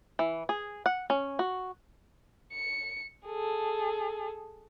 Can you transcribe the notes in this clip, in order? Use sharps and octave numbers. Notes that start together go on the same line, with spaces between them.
E3
G#4
F#5
C#4
F#4
C#7
G#4 A4